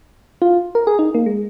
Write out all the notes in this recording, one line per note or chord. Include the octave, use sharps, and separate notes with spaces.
F4
A#4
G#4
D#4
A#3
G#3